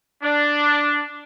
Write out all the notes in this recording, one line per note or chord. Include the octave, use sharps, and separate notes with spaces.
D4